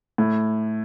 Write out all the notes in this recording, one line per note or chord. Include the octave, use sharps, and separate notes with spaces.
A2